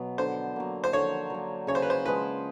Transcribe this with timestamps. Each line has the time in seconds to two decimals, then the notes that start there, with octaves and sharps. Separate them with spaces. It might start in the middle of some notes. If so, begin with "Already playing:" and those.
Already playing: B2 F#3 B3
0.18 D3 C5
0.56 F#3 A#3
0.84 C5
0.93 D3 C#5
1.30 F#3 A#3
1.67 C#3 C#5
1.75 C5
1.82 B4
1.90 C5
2.05 F3 G#3 B4